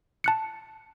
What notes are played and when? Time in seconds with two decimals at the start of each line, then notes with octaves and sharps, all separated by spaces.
0.24 A5 F#6 C#7